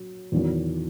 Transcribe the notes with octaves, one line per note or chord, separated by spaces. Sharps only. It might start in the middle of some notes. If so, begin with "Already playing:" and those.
Already playing: F#3
E2 D#3 F#3